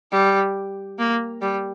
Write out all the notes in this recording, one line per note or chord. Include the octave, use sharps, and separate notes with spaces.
G3
A#3
G3